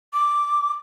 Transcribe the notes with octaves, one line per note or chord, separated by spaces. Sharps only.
D6